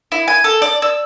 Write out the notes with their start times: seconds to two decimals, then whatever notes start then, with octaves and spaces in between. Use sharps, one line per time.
0.12 E4
0.28 G#5
0.44 A4
0.62 D5
0.82 E6